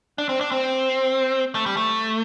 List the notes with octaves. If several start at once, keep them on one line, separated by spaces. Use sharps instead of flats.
D4
C4
D4
C4
A3
G3
A3